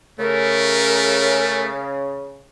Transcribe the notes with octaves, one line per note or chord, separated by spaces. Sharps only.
C#3 A3 A#4